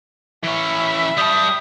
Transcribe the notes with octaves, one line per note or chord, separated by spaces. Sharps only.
E3 C#4 E5 B5
G3 A5 D#6